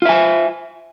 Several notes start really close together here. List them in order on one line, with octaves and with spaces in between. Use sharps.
F4 E5 G#5